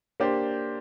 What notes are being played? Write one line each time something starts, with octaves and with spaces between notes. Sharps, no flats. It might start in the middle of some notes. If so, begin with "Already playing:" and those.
A#3 D4 G4 C5